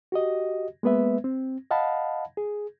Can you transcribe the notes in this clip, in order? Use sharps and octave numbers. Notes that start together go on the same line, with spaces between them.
F#4 G4 D#5
G#3 A#3 B3 B4 E5
C4
D#5 F5 F#5 A5 B5
G#4